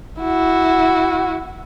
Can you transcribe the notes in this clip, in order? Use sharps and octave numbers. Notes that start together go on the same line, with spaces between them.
E4 F#4